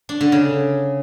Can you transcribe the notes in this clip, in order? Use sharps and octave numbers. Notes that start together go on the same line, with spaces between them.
D4
D3
C#3